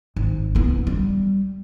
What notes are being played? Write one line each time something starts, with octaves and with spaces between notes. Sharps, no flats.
G#1
F#1 B3
G3